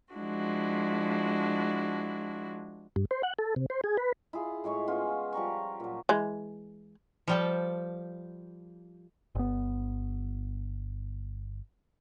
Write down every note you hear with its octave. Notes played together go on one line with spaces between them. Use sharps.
F3 G#3 D4 E4 F#4
G2
C5
F#5
A4
C3
C5
G#4
B4
E4 F4 G#4
A2 G#3 C#5 C#6
B3 C#4 F4 G#5
F3 G3 A#5 C#6
A#2 F#3
E3 G#3
F3 G3 A4
G1 B3